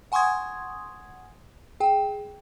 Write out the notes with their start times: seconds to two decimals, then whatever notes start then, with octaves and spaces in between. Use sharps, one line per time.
0.12 F#5 G#5 C6 C#6 D#6 G#6
1.80 G#4 G5